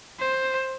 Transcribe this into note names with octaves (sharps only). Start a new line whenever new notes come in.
C5